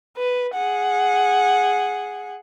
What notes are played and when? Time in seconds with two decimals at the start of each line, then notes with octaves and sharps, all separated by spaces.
0.17 B4
0.55 G#4 F#5